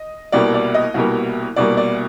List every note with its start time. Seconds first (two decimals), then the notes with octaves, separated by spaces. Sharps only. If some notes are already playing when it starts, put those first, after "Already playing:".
Already playing: D#5
0.32 C2 B2 G3 A#3 D5
0.54 D5
0.74 D#5
0.94 C2 B2 G3 A#3
1.56 C2 B2 G3 A#3 D5
1.77 D5